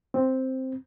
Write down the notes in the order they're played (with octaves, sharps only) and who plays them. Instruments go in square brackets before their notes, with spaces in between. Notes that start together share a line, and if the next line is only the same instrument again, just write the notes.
[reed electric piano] C4